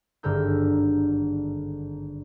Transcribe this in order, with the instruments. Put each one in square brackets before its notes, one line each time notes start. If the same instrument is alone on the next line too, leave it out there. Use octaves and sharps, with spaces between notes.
[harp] G#1 G2 D3 A#4 E6 G6